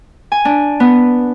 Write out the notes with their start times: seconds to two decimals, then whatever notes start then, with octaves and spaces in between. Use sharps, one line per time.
0.32 G#5
0.45 D4
0.80 B3